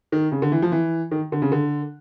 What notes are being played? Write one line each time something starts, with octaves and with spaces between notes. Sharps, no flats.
D#3
C#3
D3
E3
F3
E3
D#3
D3
C#3
D3